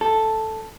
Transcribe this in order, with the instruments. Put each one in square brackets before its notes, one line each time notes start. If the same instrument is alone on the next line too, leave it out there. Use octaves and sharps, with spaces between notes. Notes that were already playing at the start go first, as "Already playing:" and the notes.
[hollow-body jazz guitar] A4